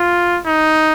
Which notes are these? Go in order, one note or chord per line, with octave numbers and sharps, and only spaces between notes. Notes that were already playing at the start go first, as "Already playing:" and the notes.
Already playing: F4
D#4